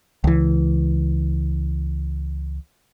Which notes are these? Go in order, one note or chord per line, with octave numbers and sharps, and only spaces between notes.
C#2 E3